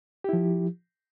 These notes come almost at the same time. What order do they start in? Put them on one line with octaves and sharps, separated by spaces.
G4 E4 F3